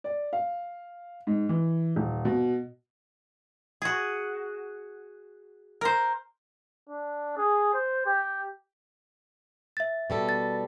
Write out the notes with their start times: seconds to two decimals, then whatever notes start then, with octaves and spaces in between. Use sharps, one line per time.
0.04 D5
0.33 F5
1.27 G#2
1.49 E3
1.96 D#1
2.25 B2
3.82 F#4 G#4
5.81 A#4 C5
6.89 D4
7.37 G#4
7.73 C5
8.06 G4
9.77 E5 A6
10.10 B2 G3 A4
10.29 A6